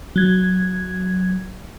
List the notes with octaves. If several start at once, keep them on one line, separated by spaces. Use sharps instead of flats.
F#3 G#6